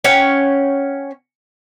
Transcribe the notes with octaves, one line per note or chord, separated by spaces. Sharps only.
C#4 C#5 F#5 G5